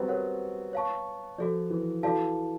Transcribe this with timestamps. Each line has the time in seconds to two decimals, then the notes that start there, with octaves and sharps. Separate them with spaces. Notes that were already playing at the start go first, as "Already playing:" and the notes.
Already playing: F#3 G3 B3 C4
0.08 A#4 C#5 F#5
0.73 C#5 F5 A5 C#6
1.38 F3 F#4 A4 D5
1.70 E3
2.03 E3 F#4 A4 D5 F5 A5